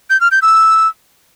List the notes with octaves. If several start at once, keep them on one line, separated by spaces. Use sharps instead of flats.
G6
F6
G6
E6